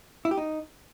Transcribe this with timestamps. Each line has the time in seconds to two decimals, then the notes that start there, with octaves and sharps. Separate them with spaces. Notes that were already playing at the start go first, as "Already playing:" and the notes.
0.25 E4
0.31 G4
0.37 D#4